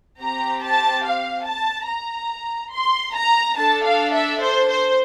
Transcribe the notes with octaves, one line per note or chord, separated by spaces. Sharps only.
C4 G4 A#5
A5
F5
A5
A#5
C6
A#5
D4 A4 A5
F5
E5
C5
C5